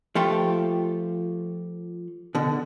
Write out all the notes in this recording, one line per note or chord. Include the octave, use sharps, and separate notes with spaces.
F3 A3 F4 G4
B2 D3